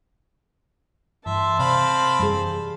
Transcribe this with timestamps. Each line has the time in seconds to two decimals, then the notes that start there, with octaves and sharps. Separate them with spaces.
1.26 G2 E3 E5 A5 C6
1.59 C3 C4 D5 F5 B5
2.20 F#2 E3 G3 G#4